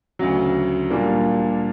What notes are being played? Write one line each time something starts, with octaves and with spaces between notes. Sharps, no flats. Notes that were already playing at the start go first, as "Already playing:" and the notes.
D2 C#3 F#3
A#2 G3 A#3 D4